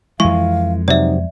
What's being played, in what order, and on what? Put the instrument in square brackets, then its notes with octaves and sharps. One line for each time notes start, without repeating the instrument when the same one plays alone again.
[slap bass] F2 G#3 [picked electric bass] E3 [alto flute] F5 [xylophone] C#6
[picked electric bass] C3 F#3 [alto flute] D#4 [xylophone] D5 E5